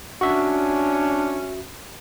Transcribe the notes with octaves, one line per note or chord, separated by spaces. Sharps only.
C#4 D4 F#4 E5